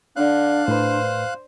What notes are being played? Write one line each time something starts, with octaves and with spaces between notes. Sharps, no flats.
D3 D4 F5 F#6
A2 B4 C5